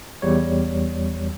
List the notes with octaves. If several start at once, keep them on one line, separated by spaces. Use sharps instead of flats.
E2 G3 C#5